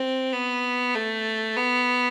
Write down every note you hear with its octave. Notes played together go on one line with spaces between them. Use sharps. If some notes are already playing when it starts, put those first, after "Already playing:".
Already playing: C4
B3
A3
B3